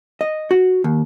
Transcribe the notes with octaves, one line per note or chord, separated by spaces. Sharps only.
D#5
F#4
D#2